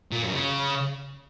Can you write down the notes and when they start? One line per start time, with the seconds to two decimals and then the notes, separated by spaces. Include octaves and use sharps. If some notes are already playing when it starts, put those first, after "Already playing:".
0.12 A#2
0.23 F#2
0.34 C#3